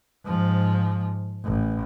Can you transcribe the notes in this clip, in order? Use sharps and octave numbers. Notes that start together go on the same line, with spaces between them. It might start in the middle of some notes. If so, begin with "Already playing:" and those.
G#2 F3
A1